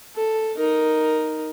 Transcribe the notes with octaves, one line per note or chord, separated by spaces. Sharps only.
A4
D#4 A#4